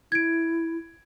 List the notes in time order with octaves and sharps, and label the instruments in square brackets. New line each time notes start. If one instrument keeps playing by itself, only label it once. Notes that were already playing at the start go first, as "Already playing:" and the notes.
[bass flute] E4 [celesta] G#6 D7